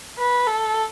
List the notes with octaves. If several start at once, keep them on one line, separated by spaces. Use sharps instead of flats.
B4
A4